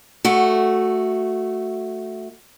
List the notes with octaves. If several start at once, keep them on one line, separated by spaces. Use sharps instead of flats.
A3 F#4